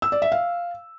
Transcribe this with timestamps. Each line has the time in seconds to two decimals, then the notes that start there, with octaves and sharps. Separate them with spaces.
0.02 E6
0.12 D5
0.22 E5
0.32 F5